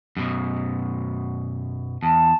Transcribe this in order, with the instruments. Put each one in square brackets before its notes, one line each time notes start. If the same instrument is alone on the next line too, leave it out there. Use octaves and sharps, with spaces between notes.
[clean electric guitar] F#2 B2
[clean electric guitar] E2 [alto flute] A5